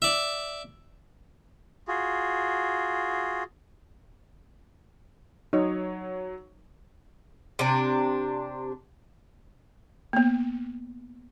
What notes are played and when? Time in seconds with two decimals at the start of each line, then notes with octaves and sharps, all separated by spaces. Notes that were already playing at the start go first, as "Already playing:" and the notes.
0.02 D5 E5
1.88 F4 F#4 G#4
5.53 F#3 D#4 C#5
7.59 C3 D4
10.13 A#3 B3